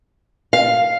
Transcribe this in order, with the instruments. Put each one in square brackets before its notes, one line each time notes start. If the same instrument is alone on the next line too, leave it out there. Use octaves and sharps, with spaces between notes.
[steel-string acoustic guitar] F5